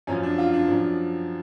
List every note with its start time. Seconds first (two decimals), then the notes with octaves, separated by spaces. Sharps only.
0.07 F#2 F3 C#4
0.23 D4
0.38 F4
0.53 D4
0.68 F#2 F3